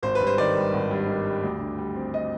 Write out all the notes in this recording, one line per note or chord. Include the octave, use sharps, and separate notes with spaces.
G#1 C5
G2 B4
C5
D#3 D5
G3
G#1
G2
D#3
G3
D2
D3
G3
C4
D#5